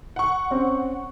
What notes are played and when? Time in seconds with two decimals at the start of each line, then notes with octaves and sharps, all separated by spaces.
0.16 F#5 C#6
0.50 C4 C#4